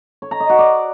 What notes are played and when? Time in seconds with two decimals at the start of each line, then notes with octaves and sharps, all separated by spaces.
0.22 C#5
0.31 A#5
0.40 D#5
0.50 F#4
0.59 D5